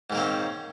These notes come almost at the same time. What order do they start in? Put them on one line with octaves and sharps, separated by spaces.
G#2 D#3 A#3 C4 C#4